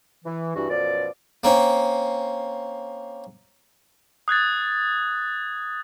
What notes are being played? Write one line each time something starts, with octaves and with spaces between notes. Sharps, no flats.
E3
G2 E3 F#4
F#2 B2 F3 D5
A#3 C4 C#4
D#6 F#6 G#6 A6